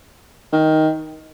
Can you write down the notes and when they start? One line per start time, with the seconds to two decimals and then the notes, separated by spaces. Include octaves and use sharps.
0.52 D#3